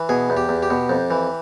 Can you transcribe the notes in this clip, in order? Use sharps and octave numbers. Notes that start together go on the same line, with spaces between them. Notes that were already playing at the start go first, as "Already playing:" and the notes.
Already playing: E3
B2 G#4
E2
G4
E2
G4
B2
F2
E3